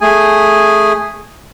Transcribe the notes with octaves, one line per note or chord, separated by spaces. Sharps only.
A3 G#4 G#5